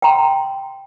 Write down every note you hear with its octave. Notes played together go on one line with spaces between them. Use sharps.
G5 A#5 C6